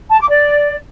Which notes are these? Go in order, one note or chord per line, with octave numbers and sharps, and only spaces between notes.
A5
D6
D5